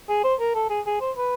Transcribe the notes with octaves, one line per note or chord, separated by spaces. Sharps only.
G#4
C5
A#4
A4
G#4
G#4
C5
B4